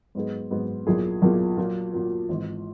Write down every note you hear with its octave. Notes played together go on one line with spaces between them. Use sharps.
G#2 F#3 B3 D#4 G#4
G#2 F#3 B3 D#4 G#4
B1 A#2 A#3 E4 G#4
B1 A#2 A#3 E4 G#4
A#2 F#3 A#3
A#2 F#3 A#3
G#1 G#2 E3